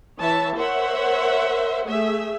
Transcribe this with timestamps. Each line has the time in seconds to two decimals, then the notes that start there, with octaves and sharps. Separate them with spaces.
0.19 E3 C#5 E5 A5
0.56 A#4 C5 C#5 E5 F#5
1.86 A3 G#4 E5